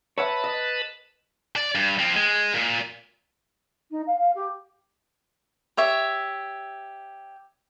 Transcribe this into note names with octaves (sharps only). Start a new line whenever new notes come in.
B4 C#5 E5 F#5 A5 B5
D#5
D5
G2
F3 C4
G#3
A#2
D#4
F5
F5
G4
G4 C#5 E5